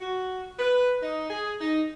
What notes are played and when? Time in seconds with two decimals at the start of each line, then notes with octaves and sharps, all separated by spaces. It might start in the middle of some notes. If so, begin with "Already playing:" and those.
0.01 F#4
0.59 B4
1.03 D#4
1.30 G#4
1.61 D#4